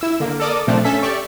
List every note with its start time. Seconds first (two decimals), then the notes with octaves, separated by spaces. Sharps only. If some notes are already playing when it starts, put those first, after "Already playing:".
0.01 E4 E6
0.20 D3 A#3
0.40 A4 A#4 D5 D6 D#6
0.67 A#2 F3 A3 C4 D4
0.84 C#4 A4 E5 B6
1.02 G4 D5 E5 C#6